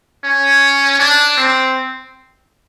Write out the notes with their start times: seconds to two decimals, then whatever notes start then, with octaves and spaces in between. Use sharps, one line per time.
0.24 C#4
0.99 D4
1.37 C4